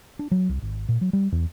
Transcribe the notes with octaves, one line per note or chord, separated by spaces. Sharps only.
D4
F#3
C2
G#1
A#2
F#3
G3
E2